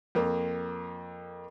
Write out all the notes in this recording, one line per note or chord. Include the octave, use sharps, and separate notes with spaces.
F2 A#3